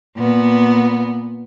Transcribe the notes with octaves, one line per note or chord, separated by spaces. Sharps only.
A#2 B3